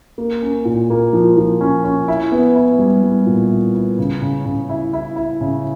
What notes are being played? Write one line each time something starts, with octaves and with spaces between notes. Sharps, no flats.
A#3
C#4
A#2
A#3
F3
F3
C#4
C#4
E4
B3
E4
G3
G3
A#2
E4
E4
C#3
C#3
C#3
E4
E4
E4
C#3